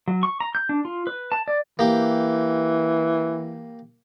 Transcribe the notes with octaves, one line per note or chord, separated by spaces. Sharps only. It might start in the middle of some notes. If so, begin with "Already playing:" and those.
F#3
C#6
A#5
G6
D4
F4
B4
A5
D5
E3 A#3 G4